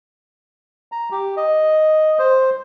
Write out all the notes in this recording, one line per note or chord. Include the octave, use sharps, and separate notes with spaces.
A#5
G4
D#5
C5